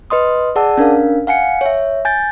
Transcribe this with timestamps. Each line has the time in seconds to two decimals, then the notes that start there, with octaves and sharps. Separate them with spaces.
0.10 B4 D#5 C6 D#6
0.56 G#4 D5 F#5 A5 E6
0.78 C#4 D4 A#4 F5
1.27 F5 F#5 G#5 C#7
1.61 C#5 E5
2.05 G#5 G6 A6